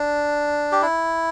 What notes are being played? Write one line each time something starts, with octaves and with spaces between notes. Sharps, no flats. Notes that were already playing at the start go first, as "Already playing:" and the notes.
Already playing: D4
G4
E4